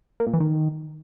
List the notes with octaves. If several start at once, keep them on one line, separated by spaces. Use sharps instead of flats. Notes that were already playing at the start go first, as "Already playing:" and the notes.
A#3
A#2
E3
D#3